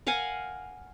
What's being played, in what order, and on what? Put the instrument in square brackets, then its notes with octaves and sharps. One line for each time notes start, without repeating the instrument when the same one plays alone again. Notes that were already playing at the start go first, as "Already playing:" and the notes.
[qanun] A#4 F5 F#5 G#5